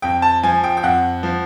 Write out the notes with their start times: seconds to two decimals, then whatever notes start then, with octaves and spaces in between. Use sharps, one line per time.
0.02 F2 G5
0.22 A5
0.43 F3 G#5
0.64 G5
0.77 G5
0.83 F2 F#5
1.23 F3